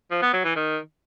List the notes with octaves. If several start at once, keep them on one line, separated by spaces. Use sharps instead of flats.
F3
B3
F#3
E3
D#3